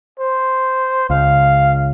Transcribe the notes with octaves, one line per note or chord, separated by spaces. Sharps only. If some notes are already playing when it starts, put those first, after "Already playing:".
C5
C#2 F5